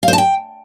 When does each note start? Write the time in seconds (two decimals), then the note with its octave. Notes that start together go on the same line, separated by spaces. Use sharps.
0.03 F5
0.08 C5
0.13 A5
0.18 G5